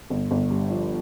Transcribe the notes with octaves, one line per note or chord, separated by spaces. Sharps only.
G1
G1
G2
F3